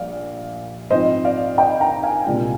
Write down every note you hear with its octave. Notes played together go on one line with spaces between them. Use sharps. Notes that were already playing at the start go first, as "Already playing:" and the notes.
Already playing: A#1 A#2 G3 D5 F5
G#2 F3 C4 F4 C5 D#5
D5 F5
D#5 G5
G5 A#5
F5 G#5
C2 A#2 G#3 D4 F4